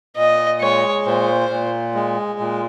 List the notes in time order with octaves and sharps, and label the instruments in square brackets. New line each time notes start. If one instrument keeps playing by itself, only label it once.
[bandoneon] A#2 [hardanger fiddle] D#5
[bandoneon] G#3 [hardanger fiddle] C#5
[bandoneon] A#2 [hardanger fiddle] C5
[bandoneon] A#2
G#3
A#2